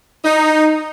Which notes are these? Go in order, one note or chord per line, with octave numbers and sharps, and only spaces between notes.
D#4